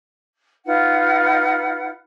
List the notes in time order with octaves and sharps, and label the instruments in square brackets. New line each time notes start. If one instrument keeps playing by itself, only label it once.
[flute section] D#4 F4 B4 F#5